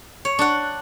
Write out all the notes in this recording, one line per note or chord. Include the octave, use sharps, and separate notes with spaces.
C#5
D4 F#5